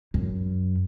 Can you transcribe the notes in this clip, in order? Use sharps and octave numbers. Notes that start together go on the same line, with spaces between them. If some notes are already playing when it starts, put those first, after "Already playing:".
F#2